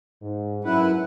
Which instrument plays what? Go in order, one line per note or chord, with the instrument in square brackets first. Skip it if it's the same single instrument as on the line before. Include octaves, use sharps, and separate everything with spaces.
[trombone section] G#2
[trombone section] F#2 [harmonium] E4 B4 F#5